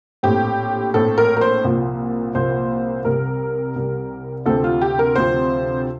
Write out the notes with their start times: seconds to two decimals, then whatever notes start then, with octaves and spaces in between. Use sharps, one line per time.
0.23 A#1 A2 A3 C4 G4
0.94 A#1 A2 A3 C4 A4
1.18 A#4
1.37 A#4
1.41 C5
1.64 C2 A#2 F3 A#3
2.35 C2 A#2 F3 A#3 C5
3.05 C2 C3 G3 A#4
3.76 C2 C3 G3
4.46 D2 C3 F3 C4 A4
4.64 F4
4.82 G4
4.99 A#4
5.16 D2 C3 F3 C4 C5